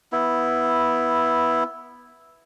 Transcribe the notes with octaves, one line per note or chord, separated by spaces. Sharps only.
B3 E4